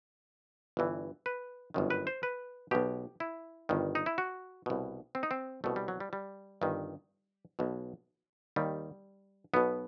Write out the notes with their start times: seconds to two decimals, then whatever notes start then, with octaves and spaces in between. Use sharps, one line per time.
0.77 G1 G2 E3
1.26 B4
1.74 G1 F#2 D#3
1.90 B4
2.07 C5
2.23 B4
2.71 B1 B2 G4
3.20 E4
3.69 G1 G2 D#3
3.95 D#4
4.06 E4
4.18 F#4
4.66 C2 B2
5.15 C4
5.23 D#4
5.31 C4
5.64 C2 B2 A3
5.76 G3
5.88 F#3
6.00 G3
6.13 G3
6.61 G1 G2 D#3
7.59 B1 B2
8.56 D#2 D#3 G3
9.54 B1 B2 B3